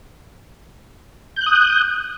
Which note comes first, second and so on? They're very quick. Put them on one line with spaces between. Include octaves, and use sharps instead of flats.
G6 F#6 D#6